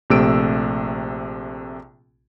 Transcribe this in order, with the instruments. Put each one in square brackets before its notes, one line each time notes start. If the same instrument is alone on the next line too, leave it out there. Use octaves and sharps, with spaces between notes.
[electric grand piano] A#1 C3 A3 E6 D7